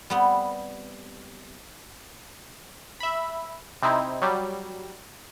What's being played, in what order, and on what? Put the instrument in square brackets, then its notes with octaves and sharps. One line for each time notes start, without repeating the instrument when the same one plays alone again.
[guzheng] G3 B3 C4
[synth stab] E5 B5
C3 C4 D#4 E4
F#3 G3